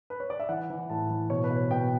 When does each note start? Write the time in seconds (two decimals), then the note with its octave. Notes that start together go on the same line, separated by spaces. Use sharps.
0.10 B4
0.20 C#5
0.30 D5
0.40 E5
0.49 E3 F#5
0.70 E3
0.89 A2 A5
1.10 E3
1.30 B2 C#5
1.44 B4
1.50 B2
1.57 C#5
1.71 B2 G5